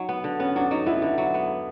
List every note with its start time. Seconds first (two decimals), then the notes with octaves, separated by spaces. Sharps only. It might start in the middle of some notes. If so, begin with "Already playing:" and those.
Already playing: F#3 D#4
0.09 B3
0.24 D3
0.39 B3 C#4
0.56 F#3 D4
0.71 F#3 D#4
0.86 B3 E4
1.02 D3
1.18 F#3
1.34 B3